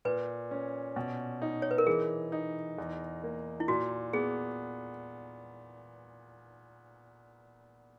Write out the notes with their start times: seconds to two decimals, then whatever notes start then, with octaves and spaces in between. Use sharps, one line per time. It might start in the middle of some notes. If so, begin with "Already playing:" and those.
0.05 A#2 B4
0.51 C#4
0.96 B2
1.42 D#4
1.62 C#5
1.71 B4
1.78 A#4
1.87 E3 G#4
2.32 D#4
2.78 E2
3.23 A#3
3.60 E4
3.68 A#2 F#4
4.13 B3 G#4